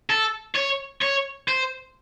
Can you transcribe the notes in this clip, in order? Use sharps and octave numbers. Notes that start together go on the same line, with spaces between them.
A4
C#5
C#5
C5